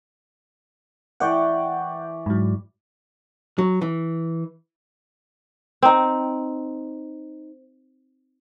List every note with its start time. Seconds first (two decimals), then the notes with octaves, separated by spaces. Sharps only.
1.20 E3 D5 F#5 G5 C#6 G6
2.26 G#2 F#3
3.58 F#3
3.82 E3
5.82 C4 D#4